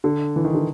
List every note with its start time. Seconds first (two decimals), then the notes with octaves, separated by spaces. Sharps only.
0.04 D3
0.36 E3
0.45 D#3
0.54 D3